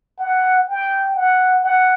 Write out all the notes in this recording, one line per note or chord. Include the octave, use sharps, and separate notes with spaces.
F#5
G5
F#5
F#5